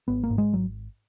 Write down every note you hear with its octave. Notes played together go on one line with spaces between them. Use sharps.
G#1 B3
A#3
G#2
G#3
G#1 F#3